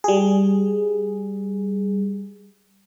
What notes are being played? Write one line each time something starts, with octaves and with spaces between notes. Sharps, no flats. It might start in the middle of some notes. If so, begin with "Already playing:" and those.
G3 G#4